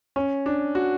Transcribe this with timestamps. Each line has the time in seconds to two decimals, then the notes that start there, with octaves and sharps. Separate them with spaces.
0.16 C#4
0.46 D4
0.75 F#4